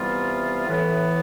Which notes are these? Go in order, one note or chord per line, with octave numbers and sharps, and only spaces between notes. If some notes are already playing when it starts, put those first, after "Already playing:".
Already playing: C3 E3 G3 B3 F4
A2 E3 B3